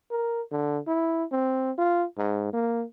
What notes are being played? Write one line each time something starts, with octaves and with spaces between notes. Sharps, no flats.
A#4
D3
E4
C4
F4
G#2
A#3